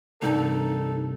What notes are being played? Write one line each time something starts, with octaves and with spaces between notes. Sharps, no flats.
C2 G2 D#4 A4